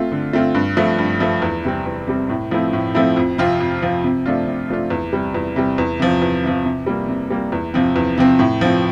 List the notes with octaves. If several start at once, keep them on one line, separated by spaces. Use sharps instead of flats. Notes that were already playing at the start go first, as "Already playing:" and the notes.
Already playing: A3 C4 F4
D3
A3 C4 F4
G2
F3 A3
G2
F3 A3
E2
C3 G3 C4
E2
C3 G3 C4
A2
F3 A3 C4 E4
A2
F3 A3 C4 E4
F2
C3 F3 C4 F4
F2
C3 F3 C4 F4
C3
F3 A3 D4 F4
C3
F3 A3 D4 F4
E2
C3 G3
E2
C3 G3
E2
C3 F3
E2
C3 F3
C3
G3 A#3
C3
G3 A#3
E2
C3 F3 C4
E2
C3 F3 C4
A2
F3 C4